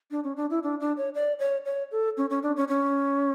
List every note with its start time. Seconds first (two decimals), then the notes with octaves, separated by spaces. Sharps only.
0.11 D4
0.24 C#4
0.37 D4
0.50 E4
0.63 D4
0.80 D4
0.97 C#5
1.15 D5
1.39 C#5
1.65 C#5
1.91 A4
2.17 C#4
2.30 C#4
2.43 D4
2.56 C#4
2.68 C#4